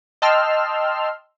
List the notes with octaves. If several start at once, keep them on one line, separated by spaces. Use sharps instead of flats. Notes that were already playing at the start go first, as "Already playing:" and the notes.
D#5 G5 A5 C6 E6 F6